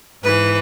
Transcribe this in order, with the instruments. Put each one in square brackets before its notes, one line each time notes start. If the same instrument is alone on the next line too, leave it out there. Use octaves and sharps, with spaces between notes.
[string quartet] G#2 E3 B4